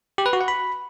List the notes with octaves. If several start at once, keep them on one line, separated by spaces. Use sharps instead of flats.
G4
B4
F#4
F#5
B5